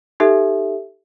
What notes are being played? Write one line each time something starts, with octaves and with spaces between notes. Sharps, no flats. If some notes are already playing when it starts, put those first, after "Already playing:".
D#4 G4 A4 E5